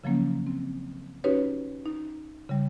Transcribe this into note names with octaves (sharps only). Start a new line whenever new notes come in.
C#3 F3 F#3 A#3 C#4
C4
C#4 D#4 F#4 G4 B4 C#5
D#4
C#3 G3